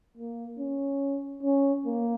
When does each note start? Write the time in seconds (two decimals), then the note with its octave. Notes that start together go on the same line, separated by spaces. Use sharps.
0.17 A#3
0.59 C#4
1.43 C#4
1.86 A#3